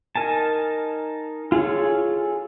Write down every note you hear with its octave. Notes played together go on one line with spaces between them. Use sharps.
D#4 A#4 G#5 A5
F4 G#4 A4 C#5